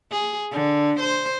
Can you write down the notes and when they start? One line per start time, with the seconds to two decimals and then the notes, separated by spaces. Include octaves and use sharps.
0.11 G#4
0.52 D3
0.99 C5